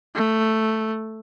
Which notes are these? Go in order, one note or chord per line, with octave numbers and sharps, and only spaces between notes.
A3